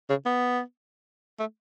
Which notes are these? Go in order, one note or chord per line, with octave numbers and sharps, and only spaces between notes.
C#3
B3
A3